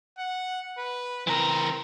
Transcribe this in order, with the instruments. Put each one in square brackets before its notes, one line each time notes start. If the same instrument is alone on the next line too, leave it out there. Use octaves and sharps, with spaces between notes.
[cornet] F#5
B4
[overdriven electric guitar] E3 A#4 [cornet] C4